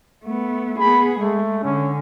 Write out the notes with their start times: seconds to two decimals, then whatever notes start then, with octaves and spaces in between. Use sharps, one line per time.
0.24 A3 B3
0.79 B3 G#4 B5
1.20 G#3 A3
1.64 D3 C#4